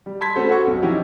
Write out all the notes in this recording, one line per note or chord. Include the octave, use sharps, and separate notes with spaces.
G3
A5 B5 C6 G#6 B6
A3 C#4 F#4 A4 C5
F#4 A4 F#5 C#6
B1
F3 C#4 D#4 E4 F#4 G4